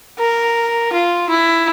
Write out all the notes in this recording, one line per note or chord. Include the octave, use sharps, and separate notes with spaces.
A#4
F4
E4